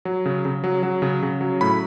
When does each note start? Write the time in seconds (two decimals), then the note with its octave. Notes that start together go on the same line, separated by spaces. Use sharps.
0.05 F#3
0.25 C#3
0.45 C#3
0.64 F#3
0.83 F#3
1.02 C#3
1.22 C#3
1.41 F#3
1.61 A2 B5